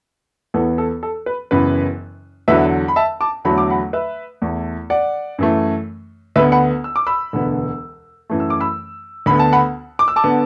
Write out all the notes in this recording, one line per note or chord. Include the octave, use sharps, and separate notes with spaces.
E2 E3 B3 A4
A4
A4
B4
F#1 F#2 E3 B3 B4
E2 D3 F#3 B4 E5
B5
E5 A5
A5 D6
E2 D3 F#3 A3 B5
D6
F#5 B5
B4 E5
E2 E3 A3
D5 F#5
F#2 E3 A3
D2 D3 B3 B4 E5
F#5 B5
E6
D6
B5 E6
E1 D2 D3 B3
F#2 E3 A3
E6
D6
B5 E6
D2 D3 B3 B5
A5
F#5 B5
D6
E6
A5 D6
D3 B3